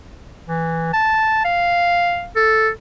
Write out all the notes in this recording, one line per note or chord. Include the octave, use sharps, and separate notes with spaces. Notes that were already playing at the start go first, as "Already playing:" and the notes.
E3
A5
F5
A4